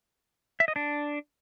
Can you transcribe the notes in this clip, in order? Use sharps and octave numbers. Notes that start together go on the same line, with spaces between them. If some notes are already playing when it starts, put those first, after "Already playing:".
E5
D#5
D4